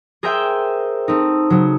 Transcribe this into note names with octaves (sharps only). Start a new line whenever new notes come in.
G#4 A#4 C5 E5 G5
A3 C4 D#4
C#3 F#3